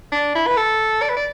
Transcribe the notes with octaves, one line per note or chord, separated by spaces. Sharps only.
D4
E4
B4
A4
D5
B4
D5